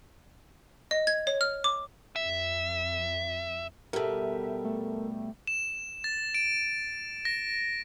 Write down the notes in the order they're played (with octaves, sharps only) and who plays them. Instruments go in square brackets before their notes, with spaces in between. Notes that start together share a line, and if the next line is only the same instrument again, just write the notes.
[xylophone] D#5
G#6
C#5
F6
D6
[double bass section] F2 [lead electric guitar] E5
[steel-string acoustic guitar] B2 G3 [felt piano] G4 [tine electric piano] A4 A#4 [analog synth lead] E5
[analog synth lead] A3
[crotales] E7
A6
D7
A#6